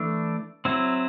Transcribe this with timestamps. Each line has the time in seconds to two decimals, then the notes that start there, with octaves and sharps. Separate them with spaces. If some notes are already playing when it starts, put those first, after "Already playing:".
Already playing: E3 A3 D4
0.65 F#3 C4 E4